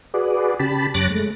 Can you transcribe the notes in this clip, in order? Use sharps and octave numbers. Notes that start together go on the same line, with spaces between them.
F#4 G#4 B4 D5
C#3 G4 A5 B5
F#2 C#5 D6 F#6 A6 A#6
G#3 A3